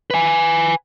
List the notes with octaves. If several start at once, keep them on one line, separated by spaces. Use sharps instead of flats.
B4 G#5